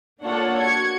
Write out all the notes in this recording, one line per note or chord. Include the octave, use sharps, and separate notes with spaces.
A#3 D4 F4 A4 C#5 F#5
F#4 G#6 C#7